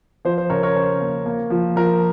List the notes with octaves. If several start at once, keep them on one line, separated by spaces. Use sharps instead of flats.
F3 C5
C5
C#3 A#4 C#5
A#4 C#5
C#4 C5
A#3
A#3
F3
F3 A#4